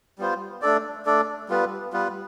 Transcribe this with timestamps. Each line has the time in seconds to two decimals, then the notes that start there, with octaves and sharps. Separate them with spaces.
0.18 G3 B3 F4 C5
0.62 A3 D4 A4 D5
1.06 A3 D4 A4 D5
1.49 G3 B3 F4 B4
1.93 G3 B3 F4 B4